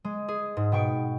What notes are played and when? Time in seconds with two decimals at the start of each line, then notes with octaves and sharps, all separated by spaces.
0.04 G#3
0.28 G#4
0.57 G#2
0.72 B2 G5 C#6 D7